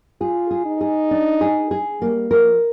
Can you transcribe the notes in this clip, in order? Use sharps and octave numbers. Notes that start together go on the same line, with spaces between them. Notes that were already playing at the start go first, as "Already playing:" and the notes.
F4 G#4
G#4
D#4
G#4
D4
G#4
G#4
G3 A#3
F3 A#4